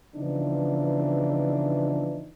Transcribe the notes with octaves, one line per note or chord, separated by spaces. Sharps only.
C#3 E3 F3 B3 D4 D#4